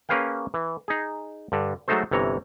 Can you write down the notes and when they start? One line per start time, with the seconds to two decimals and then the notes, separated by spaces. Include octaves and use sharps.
0.09 A#3 C#4 G#4 B4 F5 G5
0.54 E3
0.88 D#4 G#4
1.52 G2 D3
1.88 F#3 G#3 A3 D#4 A4 C5
2.11 G1 C3 E3 C#5 A#5